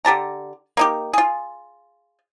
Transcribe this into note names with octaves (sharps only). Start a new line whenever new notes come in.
D3 G4 A5 A#5
A#3 D#4 G4
F4 G#4